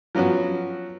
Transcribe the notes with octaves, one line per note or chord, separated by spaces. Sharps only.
F3 F#3 B3 C#4 F#4